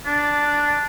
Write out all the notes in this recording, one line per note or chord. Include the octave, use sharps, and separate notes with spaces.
D4